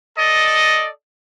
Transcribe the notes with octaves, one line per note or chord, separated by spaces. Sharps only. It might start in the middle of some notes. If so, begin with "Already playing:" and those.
A4 D5 D#5